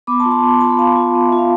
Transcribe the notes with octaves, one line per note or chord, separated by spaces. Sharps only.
B3 B5 D6
A5 C6
F4
A5 C6
B3
F4 A5 C6
B5
B3 F5 A5
F4
B3
E5
F4
F5